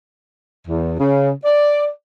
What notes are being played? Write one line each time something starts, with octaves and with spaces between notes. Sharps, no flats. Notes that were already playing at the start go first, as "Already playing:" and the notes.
E2
C#3
D5